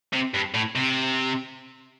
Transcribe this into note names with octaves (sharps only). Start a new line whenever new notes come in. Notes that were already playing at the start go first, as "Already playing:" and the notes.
C3
G2
A2
C3